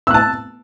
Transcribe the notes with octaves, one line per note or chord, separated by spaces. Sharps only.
A5 E6 F#6